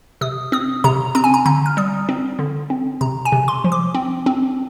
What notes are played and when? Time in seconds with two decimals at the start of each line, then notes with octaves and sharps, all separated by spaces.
0.21 C3 D#6
0.52 C4 D#6
0.84 C3 A#5
1.15 C4 A#5
1.24 G#5
1.34 A#5
1.46 D3 A#5
1.66 F6
1.77 G3 D#6
2.09 C4
2.39 D3
2.70 C4
3.01 C3 A#5
3.25 G#5
3.32 C3
3.48 C6
3.64 F3
3.72 D6
3.94 C4
4.26 C4